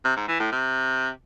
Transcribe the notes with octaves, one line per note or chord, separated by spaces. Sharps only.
C3
G#2
E3
A2
C3